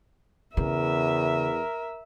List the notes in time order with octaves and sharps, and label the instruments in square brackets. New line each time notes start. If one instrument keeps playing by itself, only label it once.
[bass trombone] E2 [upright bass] C#3 [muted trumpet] A#4 [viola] E5